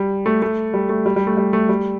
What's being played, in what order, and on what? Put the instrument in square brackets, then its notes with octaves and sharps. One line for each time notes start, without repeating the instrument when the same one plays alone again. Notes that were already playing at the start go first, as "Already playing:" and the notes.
Already playing: [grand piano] G3
A3
A3
G3
A3
G3
G3
A3
G3
A3
G3